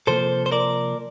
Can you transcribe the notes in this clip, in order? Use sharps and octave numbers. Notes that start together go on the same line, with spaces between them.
C3 F3 A#3 A4 C5
C5
A#4 D5